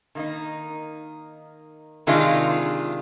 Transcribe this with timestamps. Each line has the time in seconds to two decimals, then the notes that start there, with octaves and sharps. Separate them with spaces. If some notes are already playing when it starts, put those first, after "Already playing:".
0.15 D#3 A#3 D#4
2.07 C3 D#3 G#3 D4 F4